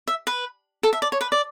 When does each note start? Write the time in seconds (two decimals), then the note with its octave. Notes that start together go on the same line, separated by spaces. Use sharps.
0.08 E5
0.27 B4
0.83 A4
0.93 E5
1.02 D5
1.12 C#5
1.21 B4
1.32 D5